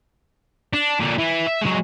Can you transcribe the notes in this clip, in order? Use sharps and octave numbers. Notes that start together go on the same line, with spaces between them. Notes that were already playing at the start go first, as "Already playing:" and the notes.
D4
A#2 D3
E3
E5
F#3 G#3